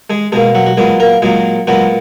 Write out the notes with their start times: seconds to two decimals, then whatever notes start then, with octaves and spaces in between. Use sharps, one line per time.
0.10 G#3 G#4
0.32 B2 G#3 A#3 G#4
0.55 F#3 F#4
0.66 F#4
0.77 A#2 F#3 G#3 B3 G#4
1.00 A#3 A#4
1.22 A#2 F#3 G#3 A#3 G#4
1.67 A#2 F#3 G#3 B3 F#4